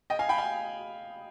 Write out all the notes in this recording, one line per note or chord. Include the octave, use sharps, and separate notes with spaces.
D#5 G5
F5 G#5
G5 B5
F5 G#5